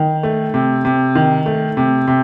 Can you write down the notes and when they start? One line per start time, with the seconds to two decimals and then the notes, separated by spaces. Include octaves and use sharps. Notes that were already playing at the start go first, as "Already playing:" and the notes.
Already playing: D#3
0.23 A3
0.54 C3
0.85 C3
1.15 D#3
1.46 A3
1.77 C3
2.08 C3